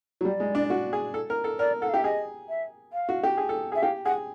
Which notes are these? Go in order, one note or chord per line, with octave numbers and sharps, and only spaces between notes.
F#3
G3 D5
G#3
D4
F#4
G#4
A4
A#4
A4
A#4 D5
A4 F#5
F5
G4 E5
G#4 D#5
E5
F5
F#4
G4
G#4
A4
G#4
E5
G4 F5
G#4 F#5